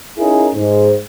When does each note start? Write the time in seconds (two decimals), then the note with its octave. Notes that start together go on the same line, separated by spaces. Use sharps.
0.18 C#4 D#4 E4 G#4 A#4
0.54 G#2